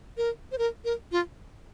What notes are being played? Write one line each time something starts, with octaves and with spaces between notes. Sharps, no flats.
A#4
C5
A#4
A#4
F4